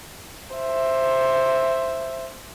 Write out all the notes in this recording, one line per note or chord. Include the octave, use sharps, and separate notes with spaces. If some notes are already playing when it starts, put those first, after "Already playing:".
C5 E5